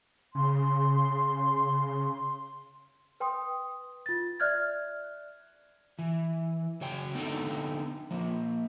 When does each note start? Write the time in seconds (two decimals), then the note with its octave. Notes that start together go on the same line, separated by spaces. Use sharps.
0.35 C#3 C6
3.20 B4 G5 C6 D#6
4.06 F4 A6
4.40 D5 E5 F6 F#6 G#6
5.99 E3
6.81 C#3 F#3 C#5 G5
7.14 D3 B3 C4 D#4 A4 G5
8.11 F3 A#3